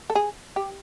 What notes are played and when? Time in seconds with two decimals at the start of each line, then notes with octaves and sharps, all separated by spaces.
0.10 A4
0.15 G#4
0.56 G4